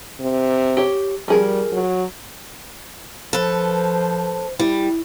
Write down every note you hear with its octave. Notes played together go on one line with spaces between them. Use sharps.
C3
G4 C#5
F3 G3 G#4 A#4
F#3
F3 A4 B4 C5
G3 E4